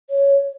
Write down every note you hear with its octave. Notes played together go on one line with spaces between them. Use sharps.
C#5